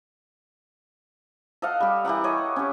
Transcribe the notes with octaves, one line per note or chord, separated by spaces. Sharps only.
A4 D#5 F5 F#5
G3 G4
E3 G4 A#4 F#5
A4 C#5 D#5
C#4 G4